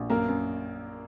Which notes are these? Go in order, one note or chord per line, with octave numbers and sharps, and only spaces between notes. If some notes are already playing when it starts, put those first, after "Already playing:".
Already playing: A#1
F#2 A#3 A#4
F#2